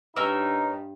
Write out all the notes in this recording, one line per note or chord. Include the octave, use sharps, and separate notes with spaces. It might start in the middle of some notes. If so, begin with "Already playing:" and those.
G2 C#4 D#4 A#4 B4 E6